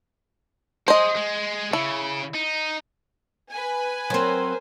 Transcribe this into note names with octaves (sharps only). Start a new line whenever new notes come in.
G#3 G#4 C5 D#5
G#3
C#3 E4
D#4
B4 G#5
F#3 C4 A#4 C5